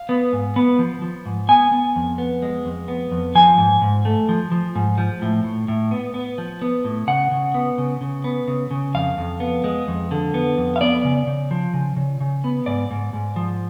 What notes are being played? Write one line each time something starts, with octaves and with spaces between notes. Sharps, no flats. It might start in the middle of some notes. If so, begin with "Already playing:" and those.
Already playing: F5
B3
G#2
B3
F3
F3
G#2
B3 G#5
B3
F2
B3
G#3
F2
B3
F2
F3 G#5
G#2
G#2
A3
F3
F3
G#2
F3
A2
A2
A2
B3
B3
F3
B3
A2
C#3 F#5
C#3
B3
C#3
C#3
B3
C#3
C#3
F2 F5
F2
B3
G#3
F2
D3
B3
F2
F5
B3 D5
C#3
C#3
F3
C#3
C#3
C#3
B3
G#2 D5
G#2
G#2
F3